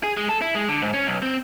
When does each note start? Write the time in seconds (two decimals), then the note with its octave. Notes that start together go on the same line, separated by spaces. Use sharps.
0.04 G#4
0.17 G#3
0.29 A4
0.42 E4
0.55 G#3
0.68 D3
0.82 G#2
0.94 C#4
1.07 B1
1.22 C4